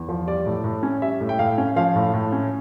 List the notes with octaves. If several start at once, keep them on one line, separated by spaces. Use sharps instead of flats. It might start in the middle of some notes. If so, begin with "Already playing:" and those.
Already playing: E2
F3
G3 D5
A2
A2
C#4
G3 E5
A2
G5
A2 F5
C#4
F3 F5
A2
A2
C#4